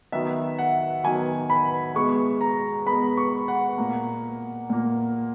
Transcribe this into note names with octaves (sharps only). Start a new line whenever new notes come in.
D#3 F#3 B3 E5
F#5
D#3 F#3 B3 G#5
B5
B2 G#3 B3 C#6
A#5
B2 G#3 B3 B5
C#6
F#5
A#2 A#3
A#2 A#3